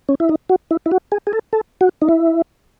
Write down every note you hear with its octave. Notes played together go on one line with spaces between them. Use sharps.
C#4
E4
D#4
F#4
E4
E4
F#4
G#4
G#4
A4
A4
F#4
D#4
E4